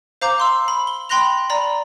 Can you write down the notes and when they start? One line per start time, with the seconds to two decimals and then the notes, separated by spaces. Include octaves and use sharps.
0.21 C5 F5 A#5 D6 G6
0.38 F5 C6 E6
0.68 B5
0.87 G7
1.09 G5 B5 C6 F#6 A#6 F7
1.50 D5 A#5 B5